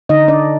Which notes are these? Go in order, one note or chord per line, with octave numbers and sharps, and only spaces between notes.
D3 D#4 D#5
D4 D5